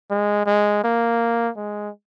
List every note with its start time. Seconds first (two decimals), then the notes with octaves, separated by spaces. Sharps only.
0.10 G#3
0.46 G#3
0.84 A#3
1.57 G#3